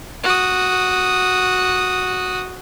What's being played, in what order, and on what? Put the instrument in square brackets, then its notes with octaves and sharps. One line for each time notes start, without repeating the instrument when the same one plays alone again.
[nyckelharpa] F#4 D#6